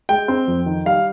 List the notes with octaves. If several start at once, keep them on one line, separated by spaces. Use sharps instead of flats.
G#3 G5
C4
F2
D#3
G3 F5